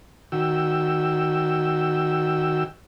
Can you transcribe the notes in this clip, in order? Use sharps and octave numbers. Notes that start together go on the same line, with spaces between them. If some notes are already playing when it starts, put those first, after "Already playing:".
D#3 F#4 G5 E6